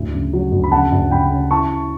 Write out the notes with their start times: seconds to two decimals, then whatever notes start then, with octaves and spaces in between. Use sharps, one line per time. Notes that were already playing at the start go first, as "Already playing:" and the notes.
Already playing: D2 A2
0.14 C#3
0.33 F#3
0.52 D2
0.64 B5
0.72 C#3 F#5 A5
0.92 D2
1.11 C#3 G5 B5
1.31 C#4
1.50 E4 A5 C#6
1.71 E4